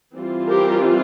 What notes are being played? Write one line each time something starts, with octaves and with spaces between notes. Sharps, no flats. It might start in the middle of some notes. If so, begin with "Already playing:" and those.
E3 G3 C4 F4
G4 A#4